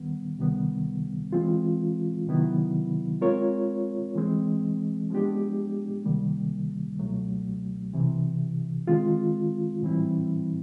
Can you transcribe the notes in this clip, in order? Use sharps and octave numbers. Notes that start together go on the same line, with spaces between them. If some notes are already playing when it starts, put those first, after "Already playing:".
Already playing: D#2 D#3 G3 B3
C#2 C3 D#3 G3 B3
E3 G#3 C4 F4
C3 D#3 F#3 B3 E4
G#3 C4 F4 A#4 C#5
E3 G#3 C4
F3 G#3 B3 D4 G4
C#2 C3 D#3 G3 A#3
C#2 B2 F#3 A3
C2 C3 E3
D#3 G#3 C4 F4
A2 E3 G3 C4 E4